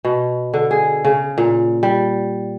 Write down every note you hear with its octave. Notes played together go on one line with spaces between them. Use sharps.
B2
D3
G#4
C#3
A#2
G3